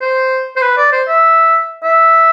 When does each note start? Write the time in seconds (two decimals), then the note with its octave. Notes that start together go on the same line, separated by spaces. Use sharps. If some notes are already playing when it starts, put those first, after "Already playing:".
0.01 C5
0.56 C5
0.62 B4
0.77 D5
0.92 C5
1.08 E5
1.83 E5